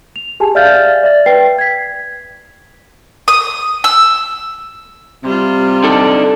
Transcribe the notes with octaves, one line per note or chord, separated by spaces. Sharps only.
F7
G4 G#4 G#5 A5
D5 E5 F5 F6 G6 A6
D5 E5 A6
B4 G5 C7
G#6 B6
D#6
E6
C3 G3 F4
D4 D#4 A4